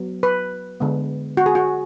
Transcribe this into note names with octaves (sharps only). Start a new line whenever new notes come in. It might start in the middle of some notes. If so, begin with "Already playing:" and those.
Already playing: F#3 B3
B4
D3 G#3 B3
F#4
G#4
F#4